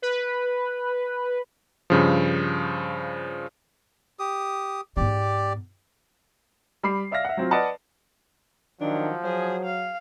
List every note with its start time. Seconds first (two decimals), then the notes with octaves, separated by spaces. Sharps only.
0.02 B4
1.90 G2 C#3 F3
4.19 G4 D#6
4.97 G#2 B3 G4 D5
6.83 G3 B5 D6 C7
7.11 D5 E5 F5 F6 A#6
7.25 E5 F#5
7.37 F#3 C4 F4
7.51 B4 D5 D#5 F#5 A5 B5
8.81 D#3 F3 F#3 D4
9.25 F#3 G#4 C5
9.65 F5